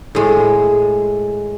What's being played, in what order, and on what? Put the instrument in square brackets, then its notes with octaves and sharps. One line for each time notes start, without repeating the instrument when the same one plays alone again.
[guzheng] A2 G#3